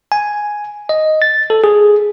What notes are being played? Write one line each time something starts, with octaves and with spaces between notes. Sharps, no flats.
G#5
D#5
A6
A4
G#4